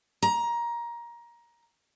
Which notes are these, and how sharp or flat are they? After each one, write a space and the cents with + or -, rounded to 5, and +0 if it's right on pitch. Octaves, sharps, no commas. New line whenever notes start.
A#5 +20